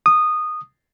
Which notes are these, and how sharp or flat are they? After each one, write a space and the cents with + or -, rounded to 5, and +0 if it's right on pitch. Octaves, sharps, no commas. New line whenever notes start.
D#6 -15